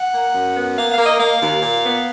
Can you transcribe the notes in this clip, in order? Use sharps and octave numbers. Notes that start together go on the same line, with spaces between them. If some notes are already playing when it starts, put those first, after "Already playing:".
Already playing: F#5
A#3
F#2
B3
A#3 F5
F5
A#3
D#5
A#3 F5
D#2
A#2
B3